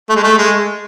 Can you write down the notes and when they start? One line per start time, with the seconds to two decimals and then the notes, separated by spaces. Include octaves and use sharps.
0.09 A3
0.16 G#3
0.23 A3
0.38 G#3